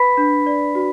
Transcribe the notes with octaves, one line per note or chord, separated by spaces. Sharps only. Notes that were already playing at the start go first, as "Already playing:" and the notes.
Already playing: B4 B5 B6
D4
D5
F#4